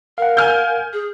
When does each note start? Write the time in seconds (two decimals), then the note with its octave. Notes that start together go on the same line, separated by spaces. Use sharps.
0.18 A#4 F5 F#5
0.37 G#5 F6 G6
0.93 G#4